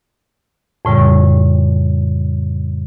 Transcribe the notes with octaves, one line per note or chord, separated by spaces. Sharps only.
F2 A2 C#3 G3